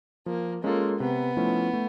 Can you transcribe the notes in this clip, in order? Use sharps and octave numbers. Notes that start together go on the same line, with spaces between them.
F3 A#3
G#3 A#3 C#4 F4 A4
C3 B3
F3 A3 C#4 E4
A3